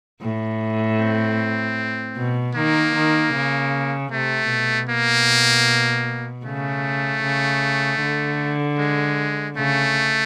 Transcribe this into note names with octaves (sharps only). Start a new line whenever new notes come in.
A2
C4
B2
D#3 A#3
D#3
C#3
C3 A3
B2
A#3
C#3 A3
C#3
D3
G#3
C#3 A3